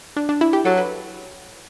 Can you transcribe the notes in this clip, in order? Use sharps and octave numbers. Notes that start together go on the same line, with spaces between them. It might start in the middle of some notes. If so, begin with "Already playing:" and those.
D4
D4
E4
G4
F#3 A4
B4